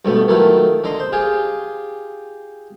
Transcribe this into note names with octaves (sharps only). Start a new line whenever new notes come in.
G2 B2 A3 B3
D#3 F#3 A3 E4 F4
D3 D#5 A#5 C6
C5
F4 G4 G#4 G#5